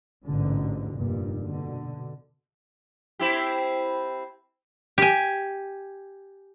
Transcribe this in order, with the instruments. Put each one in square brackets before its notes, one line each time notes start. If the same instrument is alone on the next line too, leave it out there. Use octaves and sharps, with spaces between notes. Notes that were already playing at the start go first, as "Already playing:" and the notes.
[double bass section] A1 G#2 B2 D3
F1 G2 A#2
B2 D3
[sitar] C4 E4 G4
[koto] G4 G#5